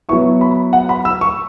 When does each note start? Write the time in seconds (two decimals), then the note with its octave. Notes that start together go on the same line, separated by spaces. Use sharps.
0.09 F#3 B3 E4 C#6
0.41 B5
0.73 F#5
0.89 B5
1.05 E6
1.21 C#6